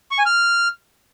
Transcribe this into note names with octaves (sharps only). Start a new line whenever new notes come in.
C#6
G#5
F6